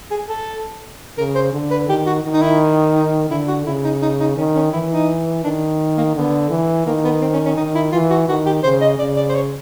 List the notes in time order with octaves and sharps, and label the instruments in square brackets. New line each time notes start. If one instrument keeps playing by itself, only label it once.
[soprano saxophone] G#4
A4
[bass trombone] C#3 [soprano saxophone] A#4
[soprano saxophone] C5
[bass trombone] D3
[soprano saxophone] B4
[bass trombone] D#3 [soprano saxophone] G4
[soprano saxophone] F#4
[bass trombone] D#3
[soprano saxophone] D#4
E4
D#4
[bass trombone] D3 [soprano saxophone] E4
[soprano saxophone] F#4
[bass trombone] C#3 [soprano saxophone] E4
[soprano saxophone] D#4
D#4
D#4
[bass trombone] D#3 [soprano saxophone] C#4
[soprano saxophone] C#4
[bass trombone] E3 [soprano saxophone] E4
[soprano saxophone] D#4
[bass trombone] D#3 [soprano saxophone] D4
[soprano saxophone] A#3
[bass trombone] D3 [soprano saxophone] B3
[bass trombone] E3
[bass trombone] D#3 [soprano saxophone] A#3
[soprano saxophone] B3
C4
C#4
C#4
[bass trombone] D#3 [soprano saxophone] D#4
[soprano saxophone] E4
[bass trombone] E3 [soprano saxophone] F4
[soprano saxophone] F#4
[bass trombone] D#3 [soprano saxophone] F#4
[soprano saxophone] G4
[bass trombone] C#3 [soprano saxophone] C5
[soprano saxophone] D#5
[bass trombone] C#3 [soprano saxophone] D5
[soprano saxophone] D5
C5
C#5